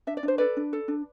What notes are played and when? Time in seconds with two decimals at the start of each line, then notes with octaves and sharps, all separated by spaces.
0.07 D4 E5
0.17 D5
0.23 D4
0.28 C5
0.38 A4 B4 D5
0.57 D4
0.73 A4
0.88 D4